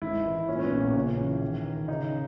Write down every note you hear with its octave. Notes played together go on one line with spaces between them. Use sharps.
G#1 E4
E3
A#2 C#4
C#4
B3
A#1
A#3
C#3 C#4
E3
D#3
D#3
C#3 D#4